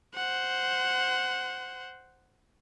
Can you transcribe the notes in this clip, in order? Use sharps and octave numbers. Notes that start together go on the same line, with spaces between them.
C5 F#5